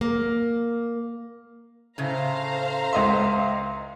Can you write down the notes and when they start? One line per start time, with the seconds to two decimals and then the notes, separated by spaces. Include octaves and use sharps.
0.01 A#3
1.98 A2 C#3 A3 C5 F5 A#5
2.93 C#2 D#5 E5 C6